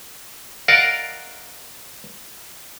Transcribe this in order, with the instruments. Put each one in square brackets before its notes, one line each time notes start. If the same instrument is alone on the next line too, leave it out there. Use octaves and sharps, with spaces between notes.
[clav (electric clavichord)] A#4 D5 D#5 F5 F#5